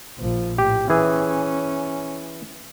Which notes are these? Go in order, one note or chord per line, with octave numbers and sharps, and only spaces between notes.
A#1 F3
A2 G4
E3 C#4 G#4